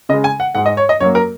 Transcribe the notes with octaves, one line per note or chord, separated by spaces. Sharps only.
C#3 G#3 D#5
G#5
F#5
G#2 G#3 F#5
D#5
C#5
D#5
F#2 F#3 A#3 C#5
A#4